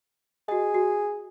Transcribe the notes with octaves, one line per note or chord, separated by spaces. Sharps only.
F#4 G#4 D#5
F#4